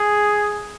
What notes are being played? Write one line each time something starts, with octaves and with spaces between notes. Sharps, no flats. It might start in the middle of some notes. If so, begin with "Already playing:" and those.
Already playing: G#4